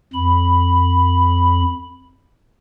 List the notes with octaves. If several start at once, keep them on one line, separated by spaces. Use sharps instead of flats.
F2 B5